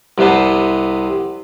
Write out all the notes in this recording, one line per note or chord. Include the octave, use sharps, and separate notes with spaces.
C2 C3 B3 C5 A5